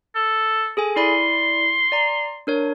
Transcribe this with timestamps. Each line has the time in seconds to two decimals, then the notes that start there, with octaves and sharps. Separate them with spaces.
0.15 A4
0.77 G#4 A4 G#5
0.96 E4 D5 B5 C6
1.92 D5 A#5
2.47 D4 A#4 C#5